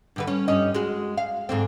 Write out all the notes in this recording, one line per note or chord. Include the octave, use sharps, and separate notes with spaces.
G2 D3 B4
C#4
G2 C#4 D#4
G#3 F#4
F5
G#2 D3 C4